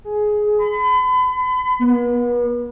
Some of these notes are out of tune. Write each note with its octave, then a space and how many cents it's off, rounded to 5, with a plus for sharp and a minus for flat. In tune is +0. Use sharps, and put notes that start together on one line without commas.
G#4 +15
B5 +40
B3 -40